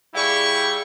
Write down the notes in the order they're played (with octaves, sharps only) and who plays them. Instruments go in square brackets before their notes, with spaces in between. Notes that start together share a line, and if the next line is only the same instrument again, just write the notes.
[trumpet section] G3 G5 C#6 [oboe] E4 [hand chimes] G#4 D5 F5